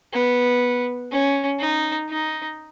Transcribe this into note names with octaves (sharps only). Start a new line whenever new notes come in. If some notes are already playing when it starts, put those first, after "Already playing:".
B3
C#4
D#4
D#4